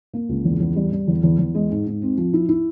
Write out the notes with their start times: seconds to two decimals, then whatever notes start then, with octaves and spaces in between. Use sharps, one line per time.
0.13 A#3
0.29 C#2
0.45 E2
0.60 E2
0.76 G3
0.92 G3
1.08 E2
1.23 E2
1.39 E2
1.55 G#3
1.70 G#2
1.86 G#2
2.02 C4
2.17 F3
2.33 E4
2.49 E4